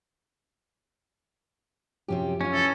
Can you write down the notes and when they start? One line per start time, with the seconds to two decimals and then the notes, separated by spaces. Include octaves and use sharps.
2.08 F#2 C3 F3 F#3 C#4 G4
2.41 C#4 D4 F4
2.53 E4 A4 B4